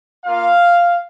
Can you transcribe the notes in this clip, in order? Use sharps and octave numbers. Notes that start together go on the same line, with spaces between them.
A#3 F4 F5